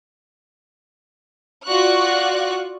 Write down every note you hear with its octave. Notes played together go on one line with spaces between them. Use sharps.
F4 F#4 D5 C#6 F#6